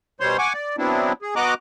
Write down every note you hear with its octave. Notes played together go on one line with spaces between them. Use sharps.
B2 G3 C5 C#5 C6
F#5 G#5 C#6 D6
D5
F#3 B3 C4 D4 E4
G#4
B3 F#4 D#5 A#5 D6 F#6